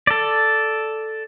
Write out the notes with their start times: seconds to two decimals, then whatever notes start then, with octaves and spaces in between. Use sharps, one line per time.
0.07 A4 D5